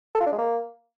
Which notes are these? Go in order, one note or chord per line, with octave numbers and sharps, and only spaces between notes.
A4
F4
D4
G#3
A#3